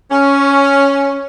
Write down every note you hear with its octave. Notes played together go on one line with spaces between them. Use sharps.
C#4